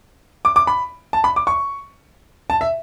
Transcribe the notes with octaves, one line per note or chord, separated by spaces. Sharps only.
D6
D6
B5
A5
B5
D6
C#6
A5
E5